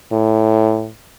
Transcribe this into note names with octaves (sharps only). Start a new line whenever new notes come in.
A2